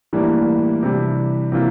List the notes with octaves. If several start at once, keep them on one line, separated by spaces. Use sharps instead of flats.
A2 E3 G3 A#3 D4
C3 E3 G3 D4
C3 E3 A#3 F4